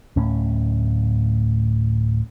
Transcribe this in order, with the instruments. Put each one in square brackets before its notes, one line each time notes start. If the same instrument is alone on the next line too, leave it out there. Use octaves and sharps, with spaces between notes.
[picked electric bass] D1 A2 C#4